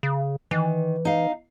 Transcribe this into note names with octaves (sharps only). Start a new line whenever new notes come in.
C#3
D#3 E3
D#4 F5